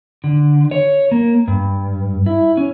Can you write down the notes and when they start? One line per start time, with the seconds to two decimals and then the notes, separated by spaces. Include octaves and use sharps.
0.24 D3
0.71 C#5
1.11 A#3
1.48 G2
2.26 E4
2.57 C#4